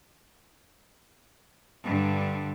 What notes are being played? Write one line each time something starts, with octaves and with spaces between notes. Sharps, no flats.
G2 D3